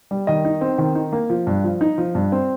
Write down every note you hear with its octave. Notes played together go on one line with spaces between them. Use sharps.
G3
D#3 D#5
D#4
C4
D#3
D#4
A#3
F3
G2
F3
D#4
F3
G2
C4